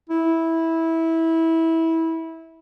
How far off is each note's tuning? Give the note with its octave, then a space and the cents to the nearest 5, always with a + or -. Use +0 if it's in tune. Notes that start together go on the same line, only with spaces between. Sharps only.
E4 -15